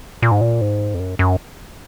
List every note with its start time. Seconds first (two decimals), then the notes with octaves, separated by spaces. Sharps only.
0.22 A#2
0.32 G#2
0.41 A#2
0.61 G#2
0.94 F2
1.00 F#2
1.19 F#2